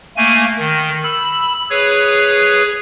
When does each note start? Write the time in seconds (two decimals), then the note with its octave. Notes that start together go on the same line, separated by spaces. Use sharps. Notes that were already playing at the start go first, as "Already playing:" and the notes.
0.17 A3 A#3 G#5
0.59 D#3
1.04 B5 E6
1.70 G#4 B4 C#5